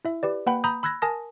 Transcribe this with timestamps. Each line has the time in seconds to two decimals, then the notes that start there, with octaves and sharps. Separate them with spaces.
0.05 E4 E5
0.23 G4 B4 D5
0.46 A#3 B4 F#5 G5 B5
0.64 A#5 B5 D#6 G6
0.83 B5 E6 F#6 G#6 A#6
1.02 A#4 G#5 A5 D#6 A#6